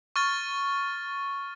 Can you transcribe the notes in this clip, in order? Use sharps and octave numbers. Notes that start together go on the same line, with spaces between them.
C#6 F6 A6